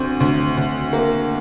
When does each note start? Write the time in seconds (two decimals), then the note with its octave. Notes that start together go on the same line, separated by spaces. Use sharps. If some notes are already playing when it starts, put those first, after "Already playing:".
Already playing: D2 C4
0.20 D2
0.57 D2
0.93 A#3